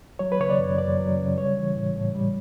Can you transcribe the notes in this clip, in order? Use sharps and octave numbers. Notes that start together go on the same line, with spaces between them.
F#3 C#5
B4
C#3 C#5
D5
F#2
F#2 D5
F#3
C#3
G3 C#5
E3
A2
A2
G3